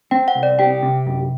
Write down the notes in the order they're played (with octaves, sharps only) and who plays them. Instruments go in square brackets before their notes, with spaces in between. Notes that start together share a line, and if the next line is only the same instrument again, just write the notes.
[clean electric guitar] C4 [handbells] G5
[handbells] F#5
[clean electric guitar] C2
[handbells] D5
[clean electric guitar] G4 [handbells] G5
[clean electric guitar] C3
F#2